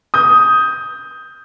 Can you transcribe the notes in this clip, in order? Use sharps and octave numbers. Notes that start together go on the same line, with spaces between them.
D#6 G6